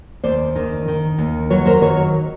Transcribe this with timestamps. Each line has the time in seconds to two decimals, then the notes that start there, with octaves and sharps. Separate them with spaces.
0.24 D#2 C5 D5
0.56 D#3
0.88 D#3
1.18 D#2
1.50 F#3 B4 C#5
1.66 A#4 C5
1.82 D#3 B4 C#5